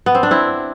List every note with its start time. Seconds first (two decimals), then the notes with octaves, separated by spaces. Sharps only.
0.06 B3
0.15 C4
0.23 D4
0.31 C4 E4